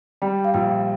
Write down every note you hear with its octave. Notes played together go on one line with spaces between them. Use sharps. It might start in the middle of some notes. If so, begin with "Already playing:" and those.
G3 G5
F5
A#1 G5